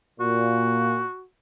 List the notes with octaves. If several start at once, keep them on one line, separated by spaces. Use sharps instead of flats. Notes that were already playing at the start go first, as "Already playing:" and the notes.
A#2 F#4